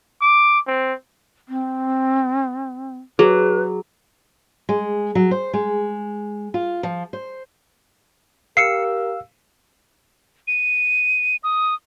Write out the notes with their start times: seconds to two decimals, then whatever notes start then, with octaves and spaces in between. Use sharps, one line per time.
0.21 D6
0.67 C4
1.49 C4
3.19 F#3 G#4 B4
4.69 G#3
5.15 F#3
5.31 C5
5.53 G#3
6.54 F4
6.83 F3
7.13 C5
8.57 G4 A#4 F5 E6 C7 C#7
10.47 D#7
11.44 D#6